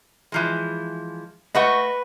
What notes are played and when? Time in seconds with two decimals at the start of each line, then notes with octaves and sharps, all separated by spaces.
0.32 E3 F3 G#3
1.55 A3 F#4 B4 D#5 F#5 C#6